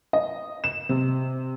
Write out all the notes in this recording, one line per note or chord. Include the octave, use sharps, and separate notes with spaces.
D#5
E7
C3